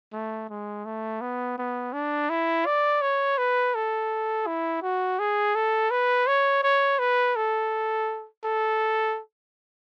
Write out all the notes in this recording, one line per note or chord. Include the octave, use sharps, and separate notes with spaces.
A3
G#3
A3
B3
B3
D4
E4
D5
C#5
B4
A4
E4
F#4
G#4
A4
B4
C#5
C#5
B4
A4
A4